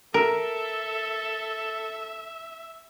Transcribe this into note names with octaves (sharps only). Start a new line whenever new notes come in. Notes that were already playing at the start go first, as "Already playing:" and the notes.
A4 A#4 E5